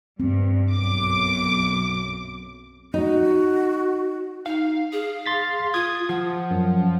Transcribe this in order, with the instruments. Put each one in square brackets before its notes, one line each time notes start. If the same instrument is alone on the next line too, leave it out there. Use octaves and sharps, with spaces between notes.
[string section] G2 [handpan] C4
[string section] B1 F#2 D6
[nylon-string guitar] D#4 [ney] F#4
[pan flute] D#4 [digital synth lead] F5
[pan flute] G#4
[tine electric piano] C6 A6 B6
[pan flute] F4 [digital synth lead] D#6 [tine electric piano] G#6
[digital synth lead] F3 [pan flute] F#5
[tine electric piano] F#2